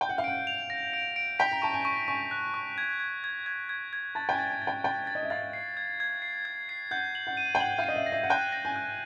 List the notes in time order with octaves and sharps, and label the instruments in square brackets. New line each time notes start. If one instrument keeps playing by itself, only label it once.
[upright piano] G5 [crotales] G6
[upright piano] F#5
F5
[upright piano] F#5 [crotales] D7
[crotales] F7
A#6
D7
D7
[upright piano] G5 [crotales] B6
[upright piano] A#5
[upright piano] A5 [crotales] C#6
[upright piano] G#5
[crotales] C#6
[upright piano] G#5 [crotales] C#6
[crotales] F#6
C#6
G#6
G#6
G#6
G#6
G#6
G#6
[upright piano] A5 [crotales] A6
[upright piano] G5
G#5
[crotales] A6
[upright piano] G#5
[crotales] A6
[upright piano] G5
[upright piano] G5 [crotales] A6
[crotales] A6
[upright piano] D#5
E5
[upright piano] F5 [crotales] A6
[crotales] C7
G#6
G#6
C7
G#6
C7
[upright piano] F#5 [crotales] G6
[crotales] F#7
[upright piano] F#5
[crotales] D#7
[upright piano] G5
[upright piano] F#5 [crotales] F#7
[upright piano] F5
[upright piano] D#5 [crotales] D#7
[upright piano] E5
[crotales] A#6
[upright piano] E5
F#5
[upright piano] G5 [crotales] F#6
[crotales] A#6
[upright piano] G#5
[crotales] F#6